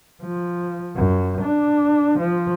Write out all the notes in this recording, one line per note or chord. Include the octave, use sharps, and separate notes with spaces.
F3
F#2
D4
F3